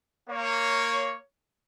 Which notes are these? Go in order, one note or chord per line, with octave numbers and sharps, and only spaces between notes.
A#3 C#5